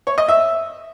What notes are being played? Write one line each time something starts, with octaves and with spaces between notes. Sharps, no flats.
C#5
D#5
E5